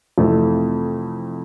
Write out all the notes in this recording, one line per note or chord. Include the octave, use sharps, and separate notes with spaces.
F2 C3 E3 A3